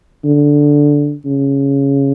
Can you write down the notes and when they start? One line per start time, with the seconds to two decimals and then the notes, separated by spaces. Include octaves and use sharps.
0.25 D3
1.25 C#3